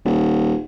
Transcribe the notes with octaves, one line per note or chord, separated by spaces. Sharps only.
D#1